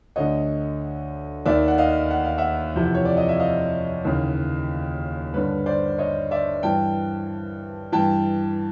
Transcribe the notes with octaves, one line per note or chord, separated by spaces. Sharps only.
D2 D3 C#5 D#5
D#2 D#3 D5 E5
F#5
D#5 F5
F#5
F5
E5 F#5
F2 C3 E3
C#5
D5
D#5
E5
D#5 F5
D#2 C#3 E3
G2 D3 B4 C#5
C5 D5
C#5 D#5
D5 E5
G2 E3 G5 A5
G2 E3 G5 A5